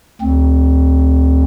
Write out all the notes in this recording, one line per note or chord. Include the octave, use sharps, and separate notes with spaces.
D2 C4